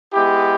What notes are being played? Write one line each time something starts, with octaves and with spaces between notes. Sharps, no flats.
G#3 B3 E4 G4